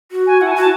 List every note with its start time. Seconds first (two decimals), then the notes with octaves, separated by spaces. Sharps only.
0.11 F#4
0.27 G#5
0.41 E4 F#5
0.47 A5
0.52 F#4 G#5
0.61 A5